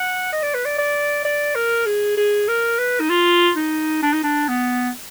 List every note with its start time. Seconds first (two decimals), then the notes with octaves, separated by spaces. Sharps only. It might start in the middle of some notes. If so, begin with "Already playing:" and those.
Already playing: F#5
0.32 D#5
0.43 D5
0.54 B4
0.65 D5
0.78 D5
1.25 D5
1.55 A#4
1.86 G#4
2.17 G#4
2.48 A#4
2.79 B4
3.00 D#4
3.10 F4
3.56 D#4
4.02 D4
4.13 D#4
4.23 D4
4.48 B3